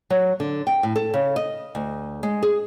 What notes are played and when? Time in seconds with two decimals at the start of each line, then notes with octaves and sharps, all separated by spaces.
0.10 F#3
0.40 D3
0.67 G5
0.83 A2
0.96 A4
1.14 C#3
1.36 D#5
1.75 D2
2.23 G#3
2.43 G#4